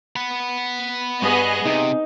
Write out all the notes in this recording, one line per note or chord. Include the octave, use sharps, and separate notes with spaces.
F#5 B5
G2 B3 G#4 D#5
C3 D#4